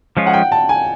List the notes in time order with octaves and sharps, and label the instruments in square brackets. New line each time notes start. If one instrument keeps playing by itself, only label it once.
[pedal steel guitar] F3 G#3 C#4 F4
[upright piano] F#5
G5
A5
G#5